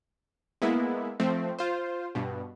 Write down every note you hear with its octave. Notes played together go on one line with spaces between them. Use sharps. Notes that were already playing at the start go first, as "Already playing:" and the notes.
G#3 A#3 B3 E4
F3 A3 C4
F4 C5
G2 B2